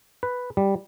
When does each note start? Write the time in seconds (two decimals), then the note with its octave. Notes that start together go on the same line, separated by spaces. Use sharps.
0.23 B4
0.57 G3